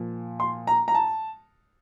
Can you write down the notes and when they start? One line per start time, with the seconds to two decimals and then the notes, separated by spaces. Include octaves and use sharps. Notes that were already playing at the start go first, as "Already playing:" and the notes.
Already playing: A#2 F3
0.40 C6
0.67 A#5
0.88 A#5
0.94 A5